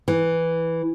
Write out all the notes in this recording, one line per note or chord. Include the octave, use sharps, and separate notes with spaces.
E3